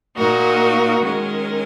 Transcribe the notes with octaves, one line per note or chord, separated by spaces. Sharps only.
A#2 A#3 D#4 F#4 A#4
D#3 G#3 C#4 A#4